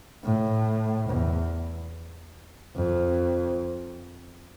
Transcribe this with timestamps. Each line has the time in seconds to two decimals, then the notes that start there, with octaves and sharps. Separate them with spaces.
0.24 A2
1.08 E2
2.76 F2